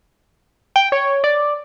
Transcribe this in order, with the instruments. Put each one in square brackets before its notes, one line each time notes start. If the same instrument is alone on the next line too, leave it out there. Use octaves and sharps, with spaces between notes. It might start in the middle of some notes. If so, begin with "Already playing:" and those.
[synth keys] G5
C#5
D5